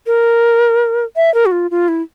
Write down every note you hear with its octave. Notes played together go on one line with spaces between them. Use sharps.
A#4
E5
A#4
F#4
F4
F4
E4